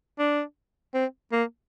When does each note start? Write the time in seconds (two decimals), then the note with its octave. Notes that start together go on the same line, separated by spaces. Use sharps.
0.19 D4
0.94 C4
1.32 A#3